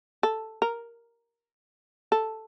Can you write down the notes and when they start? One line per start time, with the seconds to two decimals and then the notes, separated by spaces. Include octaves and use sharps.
0.23 A4
0.62 A#4
2.12 A4